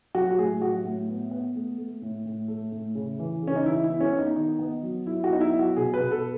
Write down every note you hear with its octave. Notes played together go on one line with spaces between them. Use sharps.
F#3 F#4
F#4
A2 G#4
F#3 F#4
A2
B3
B3
A3
A3
A2
A2
A3
A2
C#3
E3
C#3
C#4
D#4
E3 E4
B3 E4
C#4
B3
D#4
D#3 D#4
B3
F#3
F#3 E4
F#4
B3 D#4
E4
F#3
F#4
B2 G#4
B4
B2
A4